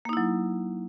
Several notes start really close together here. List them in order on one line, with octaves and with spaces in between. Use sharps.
A#3 D#4 E4 F#3